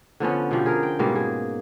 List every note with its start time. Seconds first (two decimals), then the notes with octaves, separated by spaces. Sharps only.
0.20 D3 F3 B3 C#4
0.51 B2 F3 G4
0.66 G#4 A#4
0.83 G5
0.99 G#2 B2 G3 A#3
1.15 G#4